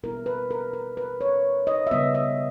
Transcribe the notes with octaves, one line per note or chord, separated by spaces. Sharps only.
B2 G3 B3 E4 A#4
B4
A#4
A#4
B4
C#5
D#5
E5
C#3 G3 B3 D#5
D#5